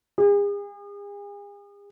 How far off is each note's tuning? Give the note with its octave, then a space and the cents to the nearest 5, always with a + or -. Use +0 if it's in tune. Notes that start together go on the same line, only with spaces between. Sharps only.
G#4 -40